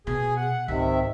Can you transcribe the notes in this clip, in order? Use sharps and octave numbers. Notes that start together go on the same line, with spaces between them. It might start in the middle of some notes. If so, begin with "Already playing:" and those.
B2 G#4 G#5
F#5
C#2 G#2 C3 D#3 E5